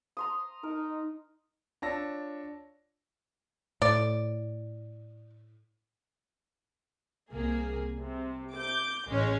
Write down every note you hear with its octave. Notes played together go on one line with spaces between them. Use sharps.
A#5 C6 D#6
D#4 A#4
D4 F4 C#5 A5 E6 A#6
A2 D5
C2 A#3 G#4
C3
D6 G6
A1 G#3 C#4 C#5